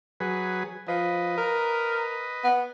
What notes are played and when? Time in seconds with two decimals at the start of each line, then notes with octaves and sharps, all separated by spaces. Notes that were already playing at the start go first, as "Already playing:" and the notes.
0.20 F#3 G#4 B4
0.88 F3 B4 D#5
1.38 A#4
2.44 B3